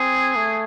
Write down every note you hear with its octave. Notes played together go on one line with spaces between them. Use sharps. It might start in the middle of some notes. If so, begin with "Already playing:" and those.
Already playing: C4 G#4
A3